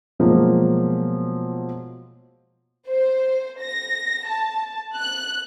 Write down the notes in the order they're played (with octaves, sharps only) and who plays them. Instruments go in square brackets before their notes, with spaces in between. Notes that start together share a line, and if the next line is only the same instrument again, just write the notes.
[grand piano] B2 F3 F#3 G#3 A#3
[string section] C5
A#6
A5
F#6